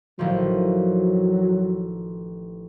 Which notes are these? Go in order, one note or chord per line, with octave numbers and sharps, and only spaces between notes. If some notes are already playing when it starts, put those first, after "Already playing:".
A1 D#3 F3 F#3